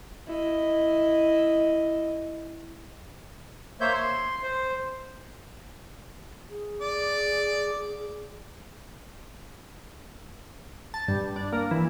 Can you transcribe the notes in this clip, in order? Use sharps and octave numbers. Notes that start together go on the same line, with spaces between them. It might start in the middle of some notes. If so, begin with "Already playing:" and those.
E4 D#5
A#3 C5 C#5 E5 G6
C6
C5
G#4
D5
A5
G2
D4
A#3
E3